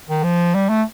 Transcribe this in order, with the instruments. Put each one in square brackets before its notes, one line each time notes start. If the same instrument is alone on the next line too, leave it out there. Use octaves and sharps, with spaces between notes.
[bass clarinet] D#3
F3
G3
A3